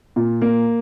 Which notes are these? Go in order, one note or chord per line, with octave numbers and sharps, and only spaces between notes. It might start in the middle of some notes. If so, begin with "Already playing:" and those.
A#2
A#3